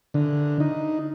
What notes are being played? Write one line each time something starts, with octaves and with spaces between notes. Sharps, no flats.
D3
D#4